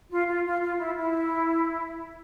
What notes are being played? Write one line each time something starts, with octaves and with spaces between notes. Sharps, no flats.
F4
F4
F4
F4
E4
E4